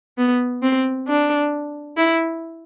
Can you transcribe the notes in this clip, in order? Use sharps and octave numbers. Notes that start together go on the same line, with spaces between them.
B3
C4
D4
E4